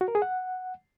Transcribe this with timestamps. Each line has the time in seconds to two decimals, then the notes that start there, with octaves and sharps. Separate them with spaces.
0.01 F#4
0.08 A#4
0.15 G#4
0.22 F#5